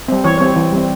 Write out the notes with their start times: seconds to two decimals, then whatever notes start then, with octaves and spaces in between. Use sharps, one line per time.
0.08 G3 C4
0.24 E3 C#5
0.38 G3 C4 C#5
0.56 E3
0.72 G3 C4